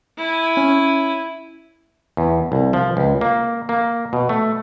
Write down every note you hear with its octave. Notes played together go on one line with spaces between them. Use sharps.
E4 G#5
C#4
E2
C2
F3
C#2
A#3
A#3
B2
A3